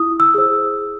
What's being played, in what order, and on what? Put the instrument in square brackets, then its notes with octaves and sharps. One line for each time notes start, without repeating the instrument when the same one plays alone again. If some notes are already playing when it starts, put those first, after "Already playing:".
Already playing: [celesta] E4 D#6
E6
G#4 C5